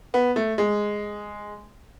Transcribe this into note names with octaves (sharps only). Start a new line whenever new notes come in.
B3
A3
G#3